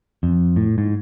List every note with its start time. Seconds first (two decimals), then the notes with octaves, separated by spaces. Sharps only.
0.23 F2
0.56 A2
0.78 G#2